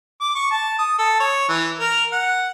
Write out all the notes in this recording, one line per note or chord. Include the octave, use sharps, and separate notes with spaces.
D6
C#6
A5
D#6
A4
C#5
E3
A#4
F#5